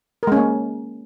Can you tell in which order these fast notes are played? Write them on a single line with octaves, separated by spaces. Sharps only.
A#4 G#3 C#4 A#3